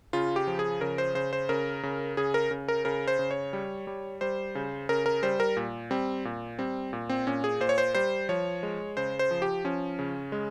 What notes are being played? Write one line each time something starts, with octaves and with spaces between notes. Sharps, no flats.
C#3 F4
G4
F3
G#4
C#3 A#4
C5
C#3 C5
C5
C#3 A#4
C#3
C#3 G#4
A#4
C#3
A#4
C#3 A#4
C5
C#3
C#5
G3
G3
G3 C5
C#3
C#3 A#4
A#4
G3 C5
A#4
A#2
G3 C4
A#2
G3 C4
A#2
C4
A#2 C#4
G#4
A#2 C5
C#5
C5
G3 C5
F3 C#5
G#3
C#3 C5
C5
F3
G4
F3 C#4
C#3
G#3